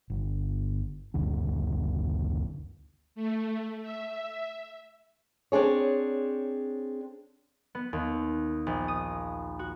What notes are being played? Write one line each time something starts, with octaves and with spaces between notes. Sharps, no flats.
G1
F#1 D2 D4
A3
E5
C4 D4 G#4 C#5
B3
D#2
A#1
D#6
F#4